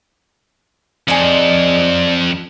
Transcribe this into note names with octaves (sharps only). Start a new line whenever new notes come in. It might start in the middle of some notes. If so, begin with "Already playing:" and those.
F2 D4 D#4 G#4